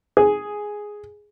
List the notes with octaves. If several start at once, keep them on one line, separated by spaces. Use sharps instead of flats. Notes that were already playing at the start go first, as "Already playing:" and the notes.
G#4